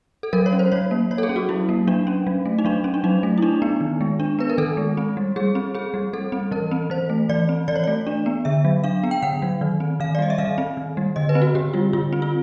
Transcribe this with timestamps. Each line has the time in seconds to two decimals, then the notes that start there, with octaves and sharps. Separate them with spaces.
0.23 A4
0.33 F#3 A#4
0.46 C#5
0.53 C#4
0.59 C5
0.72 F#3 C#5
0.91 A#3
1.11 F#3 C#5
1.18 A4
1.23 G#4
1.29 C#4
1.36 F#4
1.49 F#3 E4
1.69 A#3
1.87 F#3 D4
2.07 C#4
2.27 F#3
2.46 A3
2.59 D#4
2.65 F#3 D4
2.84 C#4
2.94 D4
3.04 F#3 D#4
3.23 A3
3.38 E4
3.42 D4 D#4
3.62 B3
3.81 D#3
4.01 G#3
4.20 D4
4.39 B3 B4
4.50 A#4
4.58 D#3 A4
4.77 G#3
4.97 C4
5.17 G3
5.36 G3 G#4
5.55 C4
5.74 C4 G#4
5.94 G3
6.13 G3 A4
6.32 C4
6.51 E3 A#4
6.71 C4
6.90 E3 C5
7.10 A3
7.29 E3 D5
7.49 C4
7.68 E3 D5
7.76 C#5
7.84 A3 D5
8.07 D4
8.26 B3
8.45 D3 E5
8.65 F#3
8.84 D4 F5
9.04 B3
9.11 G5
9.22 D3 F#5
9.42 F#3
9.61 D#3
9.80 C4
10.00 D#3 F5
10.15 D5
10.19 G3 D#5
10.30 E5
10.38 D#3 F5
10.58 C4
10.77 D#3
10.97 G3
11.16 D3 D#5
11.29 B4
11.35 C4
11.42 F#4
11.55 D3 G4
11.74 G3 F4
11.93 D3 F4
12.13 C4
12.22 F4